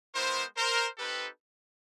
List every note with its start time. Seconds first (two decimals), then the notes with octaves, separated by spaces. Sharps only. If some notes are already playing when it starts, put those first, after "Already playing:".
0.15 G#3 B3 E4 A#4 C5
0.57 A#4 C5
0.98 C4 D#4 G4 A4 B4